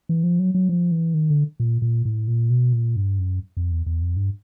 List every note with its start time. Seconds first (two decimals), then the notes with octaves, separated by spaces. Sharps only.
0.09 E3
0.23 F3
0.39 F#3
0.54 F#3
0.69 F3
0.91 E3
1.14 D#3
1.30 D3
1.60 A#2
1.82 A#2
2.05 A2
2.28 A#2
2.50 B2
2.73 A#2
2.96 G2
3.19 F#2
3.57 F2
3.72 E2
3.86 E2
4.02 F2
4.16 G2